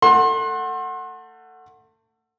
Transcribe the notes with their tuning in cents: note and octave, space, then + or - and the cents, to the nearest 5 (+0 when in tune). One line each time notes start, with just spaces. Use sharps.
A3 +30 F#5 +0 C6 +35